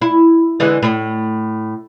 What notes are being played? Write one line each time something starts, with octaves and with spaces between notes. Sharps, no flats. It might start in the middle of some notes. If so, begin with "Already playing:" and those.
E4
D3 E3 G#3
A2